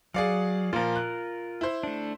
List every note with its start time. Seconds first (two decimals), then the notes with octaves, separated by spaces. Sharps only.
0.14 F#3 G#4 D5 F5
0.73 A#2 F3 F4 A#4
0.96 F#6
1.61 E4 C5
1.83 A3 D4